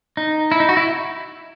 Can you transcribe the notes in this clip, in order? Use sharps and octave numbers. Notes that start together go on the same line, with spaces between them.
D#4
E4
D#4
F#4
E4